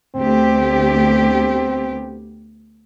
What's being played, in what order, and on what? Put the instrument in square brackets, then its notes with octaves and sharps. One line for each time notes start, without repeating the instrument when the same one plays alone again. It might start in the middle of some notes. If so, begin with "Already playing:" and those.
[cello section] D2 B3 G4 [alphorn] C4